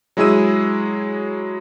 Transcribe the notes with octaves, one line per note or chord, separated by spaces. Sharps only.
F#3 G#3 E4 G#4 E6 D#7